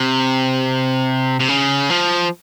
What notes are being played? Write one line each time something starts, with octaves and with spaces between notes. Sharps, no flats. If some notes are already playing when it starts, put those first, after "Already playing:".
Already playing: C3
C3
C#3
F3